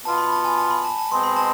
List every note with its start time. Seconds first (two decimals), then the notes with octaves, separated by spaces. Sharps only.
0.05 B2 B3 F4 A5
0.18 B5
0.32 A5
0.45 G#5
0.58 A5
0.71 B5
0.85 A5
0.99 A5
1.11 B2 G#3 C4 C6
1.24 B5
1.36 A5